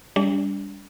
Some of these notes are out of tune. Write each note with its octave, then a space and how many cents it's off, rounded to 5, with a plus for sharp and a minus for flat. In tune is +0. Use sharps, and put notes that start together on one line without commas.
G3 +20 D4 -40